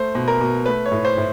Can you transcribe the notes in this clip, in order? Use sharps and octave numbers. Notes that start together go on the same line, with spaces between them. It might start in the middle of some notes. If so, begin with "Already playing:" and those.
Already playing: A3 C5
B2
A#4
B2
A3 B4
C#5
A2
C5
A2